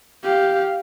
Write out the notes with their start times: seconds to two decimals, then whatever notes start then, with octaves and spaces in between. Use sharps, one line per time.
0.23 G4 F5